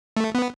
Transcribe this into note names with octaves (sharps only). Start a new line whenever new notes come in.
A3
B3